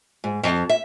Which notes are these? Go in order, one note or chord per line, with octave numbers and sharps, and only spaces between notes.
G#2
F2
E5